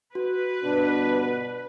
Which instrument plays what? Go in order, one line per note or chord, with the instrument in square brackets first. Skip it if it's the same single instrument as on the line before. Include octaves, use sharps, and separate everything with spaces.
[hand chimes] F#4 [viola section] B4
[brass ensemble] G1 B2 [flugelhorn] D4